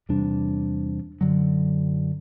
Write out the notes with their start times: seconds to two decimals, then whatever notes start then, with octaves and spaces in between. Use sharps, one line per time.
0.09 E2 C3 G3 D4
1.21 F#2 D3 F#3